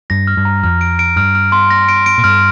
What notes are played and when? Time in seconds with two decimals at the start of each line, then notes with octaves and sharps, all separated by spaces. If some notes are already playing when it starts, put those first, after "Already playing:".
0.10 G2 A#6
0.27 F6
0.37 G2
0.45 A#5
0.63 F2 F6
0.81 D7
0.99 D7
1.16 G2 F6
1.35 F6
1.52 C6
1.70 A#6
1.89 D7
2.06 D7
2.18 A#2
2.24 G2 F6